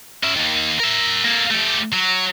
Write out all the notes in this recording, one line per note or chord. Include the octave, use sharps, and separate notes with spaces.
C#4 E5
D#3 A#3
A#4 E5
A#3 A4
A3 G4
F#3